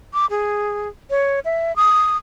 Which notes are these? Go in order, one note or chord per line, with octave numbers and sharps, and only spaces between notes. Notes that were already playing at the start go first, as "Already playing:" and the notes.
D6
G#4
C#5
E5
D#6